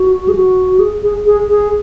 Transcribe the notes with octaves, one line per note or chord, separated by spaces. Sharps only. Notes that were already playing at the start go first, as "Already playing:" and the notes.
Already playing: F#4
G#4
F#4
G#4
G#4
G#4
G#4